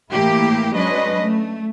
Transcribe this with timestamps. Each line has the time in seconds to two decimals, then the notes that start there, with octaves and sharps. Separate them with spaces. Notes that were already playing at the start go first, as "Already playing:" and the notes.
0.11 A2 E3 A3 A#3 E4 G4
0.72 F#3 G#3 C#4 D4 B4 D#5
1.22 A3